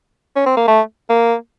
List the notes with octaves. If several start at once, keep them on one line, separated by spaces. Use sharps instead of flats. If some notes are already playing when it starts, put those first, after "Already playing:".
C#4
C4
A#3
A3
A#3